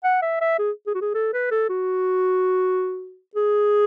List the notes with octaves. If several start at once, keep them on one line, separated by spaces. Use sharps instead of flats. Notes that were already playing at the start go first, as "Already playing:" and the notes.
F#5
E5
E5
G#4
G#4
F#4
G#4
A4
B4
A4
F#4
G#4